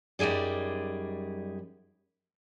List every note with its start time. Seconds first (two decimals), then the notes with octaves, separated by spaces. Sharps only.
0.19 F#2 G3 D#4 G#4 D5